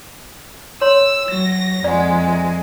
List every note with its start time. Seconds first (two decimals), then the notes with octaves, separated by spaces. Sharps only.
0.81 C#5 C6 E6
1.28 F#3 A#6
1.84 F2 G#3 D5 F#5
2.31 E5